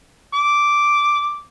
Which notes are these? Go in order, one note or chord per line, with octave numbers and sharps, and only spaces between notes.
D6